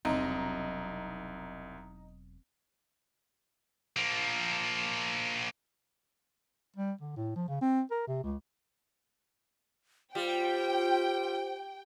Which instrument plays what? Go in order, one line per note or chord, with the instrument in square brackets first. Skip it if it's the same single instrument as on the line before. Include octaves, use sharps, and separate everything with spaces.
[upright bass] E1 F#3 [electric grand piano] C2 [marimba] C4 [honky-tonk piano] D#4
[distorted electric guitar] F3 A#3
[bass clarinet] G3
D3
A2
F3
C#3
C4
A#4
C3
C#2
[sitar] G3 [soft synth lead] F4 [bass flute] C5 [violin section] G5